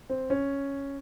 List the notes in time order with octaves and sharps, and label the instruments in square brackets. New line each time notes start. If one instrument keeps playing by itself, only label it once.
[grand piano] C4
C#4